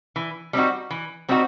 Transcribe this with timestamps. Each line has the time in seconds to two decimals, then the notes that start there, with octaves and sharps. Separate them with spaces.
0.16 E3
0.53 G3 C4 D#4 F#4
0.91 E3
1.28 G3 C4 D#4 F#4